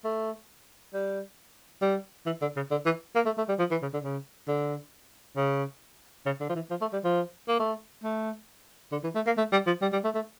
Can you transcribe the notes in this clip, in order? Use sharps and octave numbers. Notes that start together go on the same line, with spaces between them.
A3
G3
G3
E3
D3
C#3
D3
E3
A#3
A3
A3
G3
F3
E3
C#3
D3
C#3
D3
C#3
C#3
D3
F3
E3
F3
A3
G3
F3
A#3
A3
A3
D3
E3
A3
A#3
A3
G3
F3
G3
G3
A3
A3